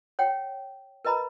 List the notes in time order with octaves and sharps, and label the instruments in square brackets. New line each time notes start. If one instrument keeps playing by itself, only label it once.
[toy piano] C#5 F#5 G5
A#4 B4 D#5 A#5 B5